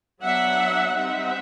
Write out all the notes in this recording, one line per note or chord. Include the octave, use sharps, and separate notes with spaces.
F#3 B3 D4 E5 F#5
G3 C4 D#4 E5 F#5